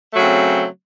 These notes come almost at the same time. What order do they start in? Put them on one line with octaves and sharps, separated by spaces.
A3 F#3 C#3 C4